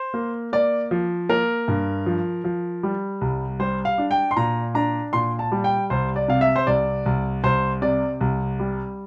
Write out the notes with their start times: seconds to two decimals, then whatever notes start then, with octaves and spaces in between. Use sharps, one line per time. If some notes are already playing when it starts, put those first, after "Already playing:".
Already playing: C5
0.14 A#3
0.53 A#3 D5
0.91 F3
1.29 A#3 A#4
1.68 G2
2.06 F3
2.44 F3
2.83 G3
3.21 C2
3.59 G3 C5
3.85 F5
3.98 D4
4.11 G5
4.31 C6
4.36 A#2 A#5
4.75 D4 A#5
5.13 A#2 C6
5.39 A5
5.52 G3
5.64 G5
5.90 C2 C5
6.16 D5
6.28 C3 F5
6.41 E5
6.56 C5
6.67 C2 D5
7.06 C2
7.43 C2 C5
7.82 C3 D5
8.21 C2
8.59 G3